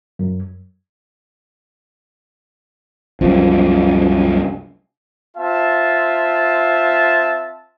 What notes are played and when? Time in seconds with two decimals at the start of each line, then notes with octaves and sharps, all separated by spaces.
0.19 F#2
3.21 C2 F#2 F3
5.37 C4 F4 E5 A5